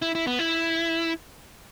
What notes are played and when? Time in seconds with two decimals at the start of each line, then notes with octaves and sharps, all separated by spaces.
0.02 E4
0.15 E4
0.27 B3
0.39 E4